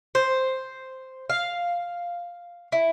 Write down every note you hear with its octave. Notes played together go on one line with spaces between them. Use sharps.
C5
F5
E4